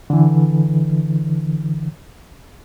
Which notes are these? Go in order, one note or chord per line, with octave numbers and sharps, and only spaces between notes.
D3 E3